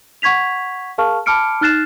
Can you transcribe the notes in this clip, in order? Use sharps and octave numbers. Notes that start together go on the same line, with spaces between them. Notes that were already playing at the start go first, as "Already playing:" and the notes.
F#5 C#6 G#6 B6 F7
G#4 A#4 F5 A5 C#6 F6
A5 B5 D6 F6 C#7 D7
D#4 F6 F#6 A6 C7 E7